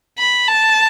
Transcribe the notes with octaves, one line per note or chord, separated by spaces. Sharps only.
B5
A5